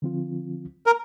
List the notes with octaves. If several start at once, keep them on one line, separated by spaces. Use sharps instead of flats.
D3 F3 C4 F4
A#4